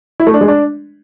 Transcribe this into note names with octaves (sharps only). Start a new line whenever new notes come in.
E4
A3
D4
G#3
D4